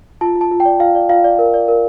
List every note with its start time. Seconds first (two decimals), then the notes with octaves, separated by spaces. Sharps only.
0.21 F4 A5
0.36 F4
0.41 A5
0.51 F4
0.60 G5
0.65 D5
0.80 F4 F5
0.95 D5
1.09 F4 F5
1.24 D5
1.39 A#4
1.54 D5
1.68 A#4